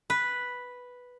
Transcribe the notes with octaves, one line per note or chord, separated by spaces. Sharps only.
B4